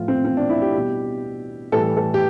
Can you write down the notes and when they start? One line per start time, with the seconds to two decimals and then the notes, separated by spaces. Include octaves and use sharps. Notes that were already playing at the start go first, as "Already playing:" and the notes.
Already playing: A2 F3 F4
0.08 C4
0.25 C4
0.37 D4
0.50 E4
0.62 G4
0.74 B2 G3
1.72 A2 E3 G3 A4
1.97 A4
2.14 G4